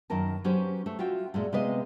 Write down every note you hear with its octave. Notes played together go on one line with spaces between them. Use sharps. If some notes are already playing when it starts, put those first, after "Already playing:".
F#2 D#3 A#4 A5
F#3 C#4 G4 B4 C5
A3
F4 F#4 E5 G5
A#2 G#3 A3
C3 G#3 B3 B4 D#5 F5